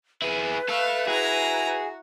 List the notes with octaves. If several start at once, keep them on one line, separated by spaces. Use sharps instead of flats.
E4 G#4 B4
A4 E5 F5
E4 F#4 G#4 A#5